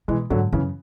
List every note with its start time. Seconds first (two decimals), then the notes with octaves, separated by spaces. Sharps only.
0.08 B2 E3 G#3
0.30 G#2 D3 F#3
0.52 F#2 C#3 E3